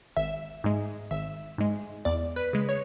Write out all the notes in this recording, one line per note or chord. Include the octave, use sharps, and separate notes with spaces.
G#1 E5
G#2 G#3
G#1 E5
G#2 G#3
E2 D5
B4
C#3 G#3
C#5